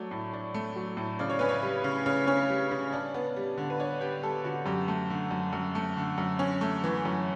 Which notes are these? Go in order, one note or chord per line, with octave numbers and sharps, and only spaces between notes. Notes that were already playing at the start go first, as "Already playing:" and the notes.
Already playing: F#3 A3 D4 C#5
A2
D4
A3
F#3
A2
C#3 D5
C#5
C#4 B4
C#5
G3
C#3
C#3 C#5
C#4
G3
C#3
D4
B3
G3
D3
B4
D4 C#5
B3 G4
G3 A4
D3 F#4
F#2 G4
A3
D3
F#2
F#2
A3
D3
F#2
C#4
A3
E3
F#2